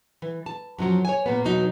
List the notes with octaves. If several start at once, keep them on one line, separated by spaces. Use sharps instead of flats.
E3
A5
F#2 F3 F#3
C#5 G#5
A#2 A#3 B3
E2 B2 F#3 D#4